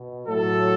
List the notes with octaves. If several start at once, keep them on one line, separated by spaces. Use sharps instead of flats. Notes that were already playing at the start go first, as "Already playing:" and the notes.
Already playing: B2
A2 F#3 A4